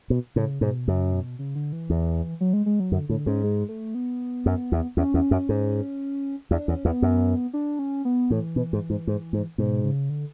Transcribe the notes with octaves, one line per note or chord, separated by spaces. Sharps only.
B2
A2 C#3
G#2 B2
F#2 C#3
B2
C#3
D3
E3
E2
F#3
G#3
G#3
F#3
F#2 D3
A2 D3
G#2 C#4
G#3
A3
B3
F#2
E2
E2 C#4
E2
F#2
G#2
E2 D4
E2 C#4
E2 B3
F#2
D4
C#4
B3
A2 E3
B2
G#2
G#2
G#2
G#2
G#2 B2
C#3
D3